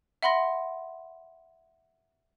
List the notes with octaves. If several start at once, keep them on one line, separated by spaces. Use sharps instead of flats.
E5 F#5 B5 C6 A#6